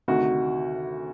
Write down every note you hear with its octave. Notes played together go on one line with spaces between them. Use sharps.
D2 C3 D#3 F#4